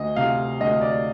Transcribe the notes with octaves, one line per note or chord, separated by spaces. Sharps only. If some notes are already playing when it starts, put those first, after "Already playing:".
Already playing: D2 D#5
C3 F5
D2 D#5
D5